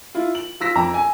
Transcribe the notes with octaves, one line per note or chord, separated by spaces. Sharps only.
E4 F4
F#7
F4 E6 A#6 B6
F2 A#5
G#5